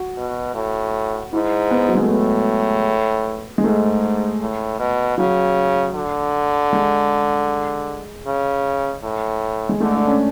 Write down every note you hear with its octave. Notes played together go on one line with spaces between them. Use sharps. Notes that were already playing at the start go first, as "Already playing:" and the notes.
Already playing: F#4
B2
A2
G#2 E4
B3
F#3
G#3
A3
A2 B3
G#3
G#2 A3
A2
B2
C#3 F#3
D3
G#3
C#3
A2
G#3
D3 A3
D4
C#4